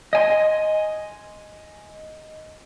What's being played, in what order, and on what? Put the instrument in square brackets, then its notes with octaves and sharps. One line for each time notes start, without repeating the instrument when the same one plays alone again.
[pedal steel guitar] D#5 G#5 C6